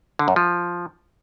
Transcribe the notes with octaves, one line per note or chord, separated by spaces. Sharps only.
D3
F#2
F3